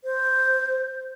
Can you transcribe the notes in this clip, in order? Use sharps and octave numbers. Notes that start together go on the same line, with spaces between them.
C5